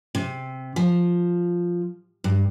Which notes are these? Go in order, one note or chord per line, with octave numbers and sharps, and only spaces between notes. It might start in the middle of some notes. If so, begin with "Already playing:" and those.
C3
F3
G2